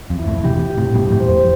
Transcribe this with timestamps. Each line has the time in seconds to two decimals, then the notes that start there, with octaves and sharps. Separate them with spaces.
0.10 F2
0.19 E4
0.27 F2 A2
0.44 C3 E3 G4
0.70 G4
0.77 A2 C3
0.94 G2 B2 G4
1.11 F2 A2
1.20 C5
1.28 F2